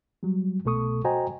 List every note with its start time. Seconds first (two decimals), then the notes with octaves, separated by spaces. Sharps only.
0.23 F#3 G3
0.65 C2 B2 A3 A4 C#6 D#6
1.04 F#4 C5 D#5 G5 G#5 A#5